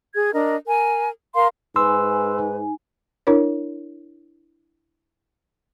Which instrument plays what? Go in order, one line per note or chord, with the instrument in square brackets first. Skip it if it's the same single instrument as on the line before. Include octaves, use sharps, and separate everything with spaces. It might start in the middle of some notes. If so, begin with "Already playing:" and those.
[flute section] G#4 G#6
D4 A#4 D#5
A#4 G#5
A#4 F5 C6
[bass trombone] G#2 [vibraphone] D#4 G#5 [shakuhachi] B4 [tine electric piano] C6 E6
[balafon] D4 E4 A#4 C#5